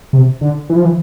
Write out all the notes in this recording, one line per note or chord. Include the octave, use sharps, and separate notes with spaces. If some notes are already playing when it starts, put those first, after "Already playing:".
C3
D3
E3
F3
E3